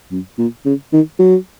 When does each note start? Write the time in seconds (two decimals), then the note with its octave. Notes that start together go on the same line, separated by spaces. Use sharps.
0.11 F#2
0.38 A#2
0.66 C#3
0.93 D#3
1.19 F#3